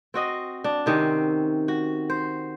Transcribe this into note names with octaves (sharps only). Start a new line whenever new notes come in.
C4 F#4 D#5
D4
C3 D#3 C4 C#4
F#4
C5